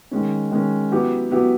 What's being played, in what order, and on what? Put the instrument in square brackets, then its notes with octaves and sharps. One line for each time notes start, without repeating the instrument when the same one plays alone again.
[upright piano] D#3 G#3 C#4
D#3 G#3 C#4
F#3 B3 E4 G4
F#3 B3 E4 G4